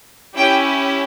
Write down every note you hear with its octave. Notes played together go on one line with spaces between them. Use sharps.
C#4 E4 G4 G5